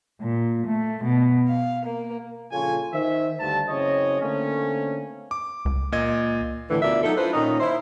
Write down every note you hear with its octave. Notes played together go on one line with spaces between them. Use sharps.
A#2
A3
B2
F5
A#3
A#1 C#3 F4 A4 C#5 G#5
D#3 C5 E5
D2 G2 A5
F#1 C#3 C4 E4 C#5 D#5
D3 A3 A#3 C4 C#4
D6
C#2
A#2 D#5 G#6
A2 D3 E3
D2 B2 F4 A#4 D5 E5
F#3 D#4 F4 A4
D4 E4 F4 B4 C5
A#2 D#3 C#4 D#4 D#5
E4 C5